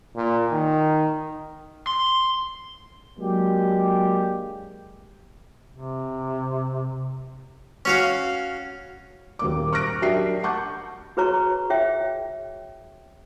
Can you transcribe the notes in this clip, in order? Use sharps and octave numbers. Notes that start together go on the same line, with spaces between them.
A#2
D#3
C6
F#3 G#3 A#3 D4 G4
C3
C#4 F#4 F5
D#1 A#3 D6
C#6 F6 F#6 A#6 D7
F#3 D4 G4 A#4 E5 C7
F#5 A5 C#6 D6 G6
F#4 G#4 B4 C#5 A#5 C#6
G#4 C#5 E5 G5